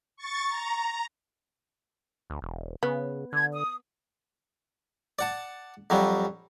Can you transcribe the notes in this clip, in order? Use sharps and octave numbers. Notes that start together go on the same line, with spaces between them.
C#6 A6
A#5
D2
E1
C#3 B3
D3 G#6
D#6
D5 F#5 A5
F2 F#3 G3